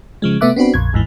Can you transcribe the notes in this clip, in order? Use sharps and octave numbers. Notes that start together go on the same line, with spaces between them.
C#3 F3 G#3
C3 A3 B3 E5 D6 F#6
B3 C4 D4 F#4 B4
A#1 F2 G#6
G#1 D#2 G#2 E3